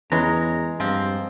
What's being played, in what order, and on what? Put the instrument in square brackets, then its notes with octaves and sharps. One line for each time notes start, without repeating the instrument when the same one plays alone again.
[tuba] E2 [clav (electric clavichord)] E3 C#4 B4 [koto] G#3 [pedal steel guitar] A#5
[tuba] G2 [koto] F3 C4